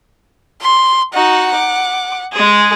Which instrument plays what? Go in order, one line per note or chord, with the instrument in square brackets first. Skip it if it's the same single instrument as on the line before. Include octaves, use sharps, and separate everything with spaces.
[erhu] C6
[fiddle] D#4 F#4 [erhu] F#5
[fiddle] D6
G#3 G#4